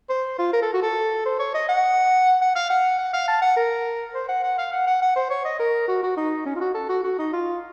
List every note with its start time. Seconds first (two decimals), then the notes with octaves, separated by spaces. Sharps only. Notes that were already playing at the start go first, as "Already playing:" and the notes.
0.09 C5
0.38 F4
0.53 A#4
0.62 A4
0.73 F#4
0.82 A4
1.25 C5
1.39 C#5
1.54 D#5
1.69 F#5
2.41 F#5
2.55 F5
2.70 F#5
2.98 F#5
3.13 F5
3.28 A5
3.42 F#5
3.56 A#4
4.14 C5
4.28 F#5
4.43 F#5
4.58 F5
4.72 F#5
4.87 F#5
5.02 F#5
5.16 C5
5.30 C#5
5.45 D#5
5.59 A#4
5.88 F#4
6.03 F#4
6.17 D#4
6.46 C#4
6.55 F4
6.61 F#4
6.74 A4
6.89 F#4
7.04 F#4
7.18 D#4
7.33 F4